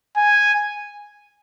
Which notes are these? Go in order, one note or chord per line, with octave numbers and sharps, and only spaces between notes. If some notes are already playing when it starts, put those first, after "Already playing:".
G#5